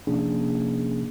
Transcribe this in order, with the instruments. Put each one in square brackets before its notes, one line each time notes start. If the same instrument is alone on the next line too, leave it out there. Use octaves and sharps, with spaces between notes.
[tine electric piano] C3 F3 A#3 C#4 D4 G#4